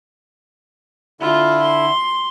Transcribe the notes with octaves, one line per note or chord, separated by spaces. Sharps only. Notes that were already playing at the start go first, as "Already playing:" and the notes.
D3 E4 F4
C6